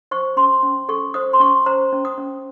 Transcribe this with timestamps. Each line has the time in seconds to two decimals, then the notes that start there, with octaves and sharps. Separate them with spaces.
0.11 C5 C#6
0.37 C#4 C6
0.63 C#4
0.89 A4 C#6
1.14 C5 D#6
1.33 C6
1.40 C#4 C#6
1.66 C5 A#5
1.92 C#4
2.05 D#6
2.18 C#4